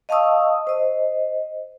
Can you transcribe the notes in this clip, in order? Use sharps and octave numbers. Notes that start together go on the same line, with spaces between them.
D#5 F5 A5 C#6 D#6 E6
C5 D#5